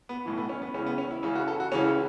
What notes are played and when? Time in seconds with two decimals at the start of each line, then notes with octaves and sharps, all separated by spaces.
0.09 B3
0.25 B1 A2 E3
0.38 B3
0.49 C#4
0.62 B3
0.74 C#2 C#3 E3 C#4
0.86 B3
0.98 C#4
1.11 E4
1.23 C#2 C#3 E3 C#4
1.35 F#4
1.48 A4
1.60 F#4
1.72 C#2 C#3 E3 C#4